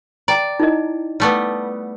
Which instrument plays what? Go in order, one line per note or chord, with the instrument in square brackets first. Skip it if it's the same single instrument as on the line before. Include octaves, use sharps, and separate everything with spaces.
[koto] D5 [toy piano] G5 A#5
[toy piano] D#4 E4 D#5
[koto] G3 A3 B3